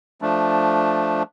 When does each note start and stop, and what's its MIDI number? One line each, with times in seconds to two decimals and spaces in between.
0.22 1.23 53
0.22 1.23 57
0.22 1.23 62